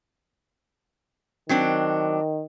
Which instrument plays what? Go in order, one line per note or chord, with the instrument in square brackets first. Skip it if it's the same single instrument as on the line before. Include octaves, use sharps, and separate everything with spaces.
[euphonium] D#3 [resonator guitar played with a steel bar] F#3 C4 D4